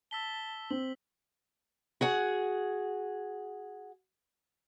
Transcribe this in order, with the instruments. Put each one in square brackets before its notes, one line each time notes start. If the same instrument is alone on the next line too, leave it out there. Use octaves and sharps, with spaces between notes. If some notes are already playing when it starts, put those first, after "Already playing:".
[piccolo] A5 [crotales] E6 B6 G7
[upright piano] C4 [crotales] F#7
[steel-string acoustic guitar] F#4 G#4 F#5